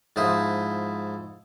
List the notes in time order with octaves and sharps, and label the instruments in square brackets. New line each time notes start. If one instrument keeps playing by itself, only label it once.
[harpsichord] G#2 F3 E4 C5 D#6